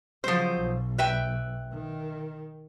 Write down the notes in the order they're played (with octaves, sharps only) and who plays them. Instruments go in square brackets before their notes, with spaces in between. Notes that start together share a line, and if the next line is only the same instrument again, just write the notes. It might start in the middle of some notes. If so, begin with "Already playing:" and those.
[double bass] C#3 F#3 [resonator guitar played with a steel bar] F3 C5
[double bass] B1
[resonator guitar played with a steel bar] B4 E5 G5
[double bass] D#3